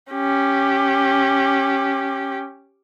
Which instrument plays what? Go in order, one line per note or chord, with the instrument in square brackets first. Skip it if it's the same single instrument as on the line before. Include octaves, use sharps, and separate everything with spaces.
[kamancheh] C#4 G4